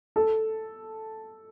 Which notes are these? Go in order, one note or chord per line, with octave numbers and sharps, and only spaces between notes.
A4